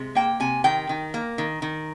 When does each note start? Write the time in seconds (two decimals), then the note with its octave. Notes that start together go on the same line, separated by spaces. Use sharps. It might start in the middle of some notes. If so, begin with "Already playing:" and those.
Already playing: C3 G#3
0.15 A#3 G5
0.40 C3 G#5
0.64 D#3 G5
0.89 D#3
1.14 A#3
1.38 D#3
1.62 D#3